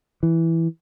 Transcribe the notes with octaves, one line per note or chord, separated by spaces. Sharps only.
E3